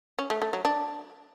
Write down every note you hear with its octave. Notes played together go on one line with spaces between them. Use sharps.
C#4
A3
A3
F#3
D4